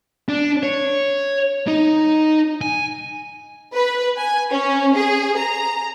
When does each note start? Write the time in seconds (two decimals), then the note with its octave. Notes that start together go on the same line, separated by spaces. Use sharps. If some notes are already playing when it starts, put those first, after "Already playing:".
0.29 D4
0.63 C#5
1.67 D#4
2.61 G#5
3.74 B4
4.17 G#5
4.51 C#4
4.96 G#4
5.38 A#5